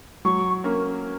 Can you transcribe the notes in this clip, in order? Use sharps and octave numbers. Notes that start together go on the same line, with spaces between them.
F#3 C#6
A#3 C#4